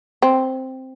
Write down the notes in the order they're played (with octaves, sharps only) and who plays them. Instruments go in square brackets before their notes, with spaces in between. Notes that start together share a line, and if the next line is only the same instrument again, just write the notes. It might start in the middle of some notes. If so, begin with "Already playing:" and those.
[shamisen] C4